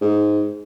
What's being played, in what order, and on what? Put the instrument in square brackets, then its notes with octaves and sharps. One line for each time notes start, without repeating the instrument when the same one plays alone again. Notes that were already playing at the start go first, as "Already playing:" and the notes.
[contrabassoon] G#2